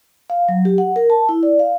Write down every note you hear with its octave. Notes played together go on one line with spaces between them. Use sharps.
F5
F#3
G4
F#5
A#4
A5
E4
D5
F5